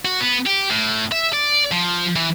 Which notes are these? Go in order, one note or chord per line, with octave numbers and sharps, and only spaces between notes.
F#4
B3
G4
A2
E5
D5
F3
E3